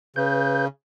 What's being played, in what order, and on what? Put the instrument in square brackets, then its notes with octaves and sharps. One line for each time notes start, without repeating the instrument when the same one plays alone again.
[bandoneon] C#3 [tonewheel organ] B4 G6